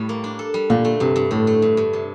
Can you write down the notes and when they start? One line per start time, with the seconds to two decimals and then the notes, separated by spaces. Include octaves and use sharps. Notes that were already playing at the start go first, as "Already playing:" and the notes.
Already playing: A2 G3
0.09 A#3
0.24 D4
0.39 A4
0.54 G3
0.70 A#2 D3
0.85 A3
1.00 G2 C3
1.16 G2
1.31 A2 D3
1.47 A3
1.62 G2
1.77 G2
1.93 C3